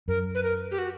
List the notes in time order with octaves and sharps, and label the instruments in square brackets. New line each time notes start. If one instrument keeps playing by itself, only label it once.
[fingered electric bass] F#2 [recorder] A#4
[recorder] B4
A#4
G4
F#4